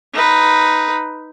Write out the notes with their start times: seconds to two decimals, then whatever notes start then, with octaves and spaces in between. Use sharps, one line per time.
0.13 D#4 B4